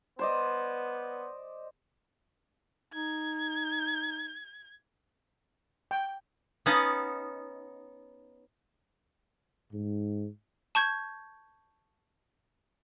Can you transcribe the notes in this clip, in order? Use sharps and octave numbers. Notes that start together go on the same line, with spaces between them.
B3 C5 D5 D#5
D#4 G#6
G5
B3 C#4 D#4 F#4 F5 A5
G#2
A5 C#6 G6 G#6